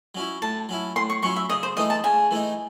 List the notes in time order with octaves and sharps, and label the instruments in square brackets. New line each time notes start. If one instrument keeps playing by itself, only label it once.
[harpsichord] F#3 C#4 E4
[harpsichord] A2 [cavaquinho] A5
[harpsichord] F#3 C#4 E4
[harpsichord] A2 [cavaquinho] C6
[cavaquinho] C#6
[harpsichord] F#3 C#4 E4 [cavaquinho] C#6
[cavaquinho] E5
[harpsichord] C#3 [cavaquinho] D#5
[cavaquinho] C5
[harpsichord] E3 A3 D#4 [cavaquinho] D#5
[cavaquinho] A5
[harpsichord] C#3 [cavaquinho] G#5
[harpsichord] E3 A3 D#4